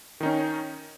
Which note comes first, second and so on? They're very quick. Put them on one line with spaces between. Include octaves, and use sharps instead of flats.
D#3 D#4 C#4